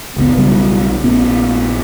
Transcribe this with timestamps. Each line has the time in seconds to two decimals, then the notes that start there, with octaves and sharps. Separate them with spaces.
0.17 F#1 C#2 C3 B3
0.37 B1 C#3 F#3 G3
1.04 A#1 A#2 B3 C#4